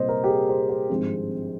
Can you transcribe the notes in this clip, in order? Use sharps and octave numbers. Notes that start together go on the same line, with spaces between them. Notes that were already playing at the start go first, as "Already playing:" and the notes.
Already playing: C2 A#2 G3 C4 C5 D#5
A#4
G4
G#4
C5
C5
G#1 G2 F3 G#3 C4